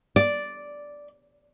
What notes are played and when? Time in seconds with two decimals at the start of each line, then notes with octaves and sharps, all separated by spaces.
0.16 D5